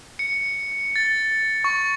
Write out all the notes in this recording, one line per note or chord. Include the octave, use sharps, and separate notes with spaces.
C#7
A6
C#6